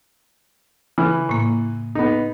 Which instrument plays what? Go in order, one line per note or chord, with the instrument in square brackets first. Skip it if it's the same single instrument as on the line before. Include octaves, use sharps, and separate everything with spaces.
[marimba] C#3 [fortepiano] E3
[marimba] A2 A#3
[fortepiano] B3 D#4